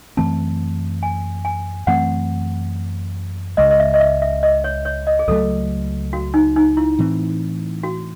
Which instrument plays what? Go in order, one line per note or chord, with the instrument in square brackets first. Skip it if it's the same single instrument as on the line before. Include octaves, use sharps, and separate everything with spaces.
[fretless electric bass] F#2 E3 A3 C4 [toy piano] A5
[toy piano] G#5
G#5
[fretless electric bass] F#2 E3 A3 C4 [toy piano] F#5
[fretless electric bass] C#2 C#3 G#3 [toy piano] D#5
[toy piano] D#5
E5
D#5
E5
E5
D#5
C#5
C#5
D#5
G#4
[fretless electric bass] C#2 C#3 F#3 A3 [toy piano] A4
[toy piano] F#4
D#4
D#4
E4
[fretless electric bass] A2 E3 C4
[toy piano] F#4